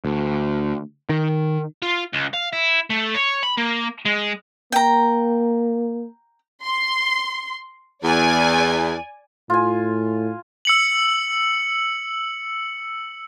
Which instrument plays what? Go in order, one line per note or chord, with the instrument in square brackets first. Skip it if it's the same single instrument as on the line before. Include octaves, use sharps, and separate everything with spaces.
[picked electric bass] D2
D#3
[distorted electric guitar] F4
C#2
F5
E4
A3
C#5
B5
A#3
G#3
[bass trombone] A#3 [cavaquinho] G5 A#5
[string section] C6
[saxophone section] E2 [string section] D5 G#5
[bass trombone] A2 [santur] F4 G#5
[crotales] E6 C#7 F#7